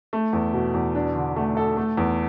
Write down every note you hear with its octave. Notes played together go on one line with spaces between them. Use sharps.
A3
E2
B2
E2
D4
D3
A3
A4
A3
E2